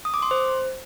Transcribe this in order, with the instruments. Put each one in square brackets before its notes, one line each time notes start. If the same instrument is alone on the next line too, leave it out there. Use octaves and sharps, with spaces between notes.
[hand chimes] D#6
D6
C6
C5